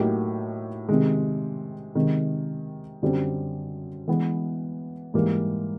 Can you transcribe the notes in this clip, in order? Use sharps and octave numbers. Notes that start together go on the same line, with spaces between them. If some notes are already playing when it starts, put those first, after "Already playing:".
Already playing: A2 F#3 A#3 D#4 G4
C3 D#3 G#3
C3 D#3 G#3
F#2 D3 G3 C4
E3 G#3 B3
G#2 E3 G3 A#3